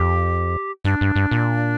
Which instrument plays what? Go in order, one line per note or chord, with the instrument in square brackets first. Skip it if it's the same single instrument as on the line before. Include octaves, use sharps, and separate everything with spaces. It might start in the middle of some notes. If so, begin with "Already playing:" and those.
Already playing: [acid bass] F2 [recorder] G4
[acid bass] G2 [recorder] D4
[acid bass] G2
G2
A#2